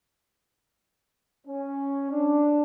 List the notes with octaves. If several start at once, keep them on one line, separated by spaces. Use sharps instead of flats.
C#4
D4